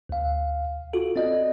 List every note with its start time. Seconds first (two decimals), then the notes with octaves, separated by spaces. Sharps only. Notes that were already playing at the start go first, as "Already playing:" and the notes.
0.09 D2 F5
0.93 F4 F#4 A4
1.16 C4 D5 D#5